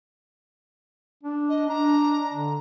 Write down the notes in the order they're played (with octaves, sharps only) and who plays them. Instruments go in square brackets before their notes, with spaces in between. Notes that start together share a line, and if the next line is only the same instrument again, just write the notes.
[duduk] D4
[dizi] D#5
[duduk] D4 [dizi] A#5
[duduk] D3